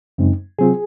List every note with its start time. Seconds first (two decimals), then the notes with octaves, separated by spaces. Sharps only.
0.18 F#2 C#3 G#3 C4 D#4
0.59 C3 F#3 C4 F4 G#4